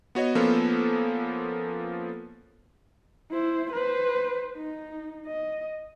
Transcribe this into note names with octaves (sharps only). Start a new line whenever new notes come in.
B3 F#4 C#5 D#5
F3 A#3 B3 C#4 F4 A4
E4 C5
B4 C5
D#4
D#5